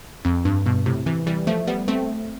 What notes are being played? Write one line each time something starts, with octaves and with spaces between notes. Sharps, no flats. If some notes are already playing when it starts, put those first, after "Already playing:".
F2
G2
G2 B2
A2 C3
C3 E3
E3 G3
F3 A3
G3 B3
A3 C4